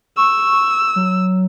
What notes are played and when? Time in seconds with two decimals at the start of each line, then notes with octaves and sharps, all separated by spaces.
0.17 C#6 E6
0.96 F#3